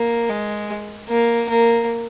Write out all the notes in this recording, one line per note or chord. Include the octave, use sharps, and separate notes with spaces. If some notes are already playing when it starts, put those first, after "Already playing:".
Already playing: A#3
G#3
A#3
A#3